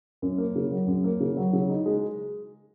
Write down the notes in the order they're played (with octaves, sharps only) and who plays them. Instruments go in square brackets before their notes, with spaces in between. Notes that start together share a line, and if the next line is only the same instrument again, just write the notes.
[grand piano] F#2
A#3
C#3
F#3
F#2
A#3
C#3
F#3
C#3
D#4
G#3